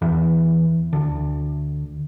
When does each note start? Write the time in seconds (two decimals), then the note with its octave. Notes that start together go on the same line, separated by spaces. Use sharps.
0.02 E2
0.93 D2